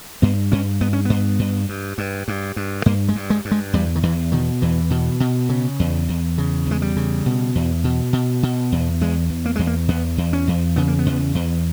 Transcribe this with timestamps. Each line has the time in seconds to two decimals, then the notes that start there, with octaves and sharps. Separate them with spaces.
0.22 G2 B3
0.52 G2 C#4
0.81 G2 B3
0.93 C#4
1.05 G2 B3
1.39 G2
1.69 G2
1.98 G2
2.28 G2
2.56 G2
2.86 G2 A#3
3.09 G#3
3.16 G2
3.30 G#3
3.45 G2
3.51 G#3
3.73 E2 G3
3.96 D#3
4.03 E2 E3
4.32 B2 D#3
4.62 E2 E3
4.90 B2
5.20 B2
5.49 C#3
5.79 E2
6.09 E2
6.38 C#3
6.66 E2 G#3
6.82 G3
6.97 C#3
7.26 B2
7.55 E2
7.84 B2
8.13 B2
8.43 B2
8.72 E2
9.01 E2 G#3
9.30 E2
9.46 A#3
9.56 E2 G#3
9.67 A#3
9.88 E2 B3
10.18 E2
10.33 C#4
10.48 E2
10.76 C#3 B3
10.88 A#3
10.99 B3
11.06 E2
11.35 E2